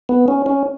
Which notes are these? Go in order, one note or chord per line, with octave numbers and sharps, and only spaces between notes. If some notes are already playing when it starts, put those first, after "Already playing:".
B3
C#4
C#4